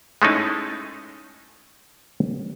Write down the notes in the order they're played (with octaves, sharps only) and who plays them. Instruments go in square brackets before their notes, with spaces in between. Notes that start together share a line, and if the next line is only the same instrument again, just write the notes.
[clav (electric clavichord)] G#3 A3 C#4 D#4 E4